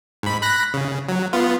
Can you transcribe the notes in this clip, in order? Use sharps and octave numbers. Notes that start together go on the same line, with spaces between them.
G#2 B5
B5 F#6 A#6
C#3
F#3
B3 F4